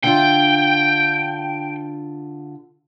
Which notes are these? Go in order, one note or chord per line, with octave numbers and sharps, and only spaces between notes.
D3 D4 F4 G5